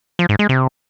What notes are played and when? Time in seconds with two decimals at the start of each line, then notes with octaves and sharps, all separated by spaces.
0.19 F3
0.29 G#2
0.39 G#3
0.49 C3